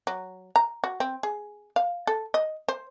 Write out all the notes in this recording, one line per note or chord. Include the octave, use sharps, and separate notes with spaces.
F#3
A#5
F#4
C4
G#4
F5
A4
D#5
C5